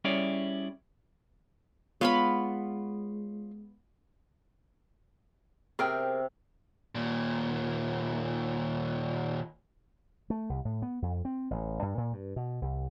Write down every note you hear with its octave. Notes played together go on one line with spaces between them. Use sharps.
G3 C#4 E4 G#4 C#5 D5
G#3 B3 F4 C#5 F5 B5
C3 G#4 A#4 G5
D#2 A#2
A3
C2
A2
B3
F2
C4
A1
G2
A#2
G2
B2
C2